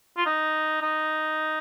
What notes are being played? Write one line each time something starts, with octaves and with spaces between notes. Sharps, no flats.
F4
D#4
D#4